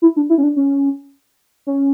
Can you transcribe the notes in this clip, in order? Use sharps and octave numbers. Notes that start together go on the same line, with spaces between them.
E4
D4
E4
C#4
D4
C#4
C#4